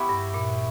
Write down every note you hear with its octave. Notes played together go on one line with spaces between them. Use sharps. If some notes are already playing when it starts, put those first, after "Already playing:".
Already playing: B3 E4 G4 C#5
G2
A#2